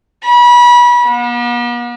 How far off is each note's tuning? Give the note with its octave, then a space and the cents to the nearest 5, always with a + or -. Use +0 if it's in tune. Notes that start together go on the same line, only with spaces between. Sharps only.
B5 -30
B3 -45